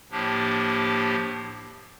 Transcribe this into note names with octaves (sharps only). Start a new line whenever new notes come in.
A2 F3 A#3 D4 G4